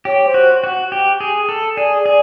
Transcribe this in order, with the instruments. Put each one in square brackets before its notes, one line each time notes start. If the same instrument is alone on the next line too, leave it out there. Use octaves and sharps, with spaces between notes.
[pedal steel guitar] G4 [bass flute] C#5
[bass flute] C5
[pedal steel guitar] F#4
F#4
G4
G#4
A4
[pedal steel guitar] G#4 [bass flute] D5
[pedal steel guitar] G#4